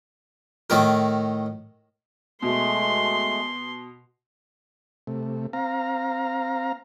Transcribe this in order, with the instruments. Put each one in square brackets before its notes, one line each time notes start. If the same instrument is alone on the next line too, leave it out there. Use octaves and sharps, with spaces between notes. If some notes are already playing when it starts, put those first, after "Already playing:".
[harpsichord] A2 D#3 A#4
[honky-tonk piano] B2 [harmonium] G#3 A3 [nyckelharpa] C6
[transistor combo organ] C3 A3
C4 F5 A#5